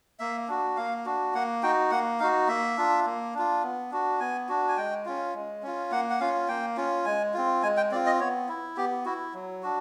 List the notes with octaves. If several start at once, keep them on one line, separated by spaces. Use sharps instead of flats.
A#3 E5
D4 F#4
A#3 F5
D4 F#4
A#3 F#5
D#4 F#4 G5
A#3 F#5
D#4 F#4 F5
A#3 E5
D4 F4
A#3
D4 F4
B3
D4 F#4
B3 G#5
D4 F#4
G#5
G#3 G5
C#4 F4
G#3
C#4 F4
A#3 F#5
F#5
C#4 F4 F5
A#3 G5
C#4 F4
G#3 G#5
C4 F4
G#3 G#5
G5
C4 F4 D5
D#5
B3 C#5
E4
B3 G4
E4 F#4
F#3
D4 F#4